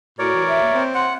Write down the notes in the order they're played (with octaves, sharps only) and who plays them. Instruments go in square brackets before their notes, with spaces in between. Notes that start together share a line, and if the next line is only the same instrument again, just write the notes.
[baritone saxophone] A2 [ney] F#4 [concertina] A#4 C#5 D5
[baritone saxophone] E3
[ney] E5
[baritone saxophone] A#3
C4
[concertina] F#5 [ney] C6